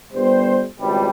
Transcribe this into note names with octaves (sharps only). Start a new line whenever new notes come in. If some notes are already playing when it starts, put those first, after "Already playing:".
G1 G3 B3 C5
G#1 C#2 G3